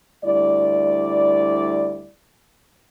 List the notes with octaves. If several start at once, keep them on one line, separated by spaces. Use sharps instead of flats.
D2 G3 E4 D5